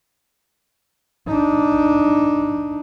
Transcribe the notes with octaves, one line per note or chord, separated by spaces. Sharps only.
D4 D#4